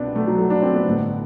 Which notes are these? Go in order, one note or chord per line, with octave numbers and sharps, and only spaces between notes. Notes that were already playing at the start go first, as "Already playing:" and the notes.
Already playing: C2 B2 B3 C4 D4
A3
F#3
A3
D4
C4
B3
A1 G2 D3